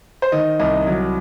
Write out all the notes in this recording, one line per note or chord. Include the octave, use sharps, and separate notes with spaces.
C5
D#3 D#5
C2 D#5
F#3